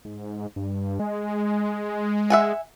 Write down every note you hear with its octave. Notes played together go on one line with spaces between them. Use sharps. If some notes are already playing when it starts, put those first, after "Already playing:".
G#2
G2
G#3
E5 F#5 G#5